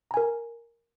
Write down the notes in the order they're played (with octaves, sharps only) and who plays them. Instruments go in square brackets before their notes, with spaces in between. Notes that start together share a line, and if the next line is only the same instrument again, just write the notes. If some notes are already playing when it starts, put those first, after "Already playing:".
[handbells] A#5
G#5
A#4